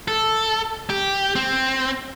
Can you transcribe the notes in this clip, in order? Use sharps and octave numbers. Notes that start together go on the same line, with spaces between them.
A4
G4
C4